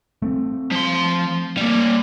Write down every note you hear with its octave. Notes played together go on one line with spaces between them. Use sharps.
A3 C4
F3 C6
G3 A#3